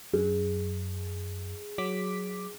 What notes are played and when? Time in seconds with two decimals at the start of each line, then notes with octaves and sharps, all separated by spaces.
0.13 F#2 G#4
1.78 F#3 D6 B6